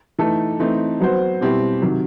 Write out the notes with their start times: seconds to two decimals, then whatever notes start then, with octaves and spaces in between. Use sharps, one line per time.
0.19 E3 A3 D#4 A4
0.60 E3 A3 C4 D#4
1.01 F#3 B3 F#4 C5
1.41 B2 G3 C4 E4 G4
1.82 C3 D#3 F#3